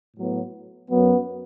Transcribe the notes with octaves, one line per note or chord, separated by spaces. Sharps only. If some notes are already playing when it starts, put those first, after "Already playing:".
A2 F#3 B3
F#2 F#3 B3